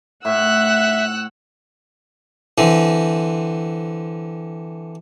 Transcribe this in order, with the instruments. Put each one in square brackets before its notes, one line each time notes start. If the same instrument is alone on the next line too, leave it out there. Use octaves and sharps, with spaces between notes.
[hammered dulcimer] A2 [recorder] E5 [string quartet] F#5 E6 F#6
[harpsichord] D3 E3 C4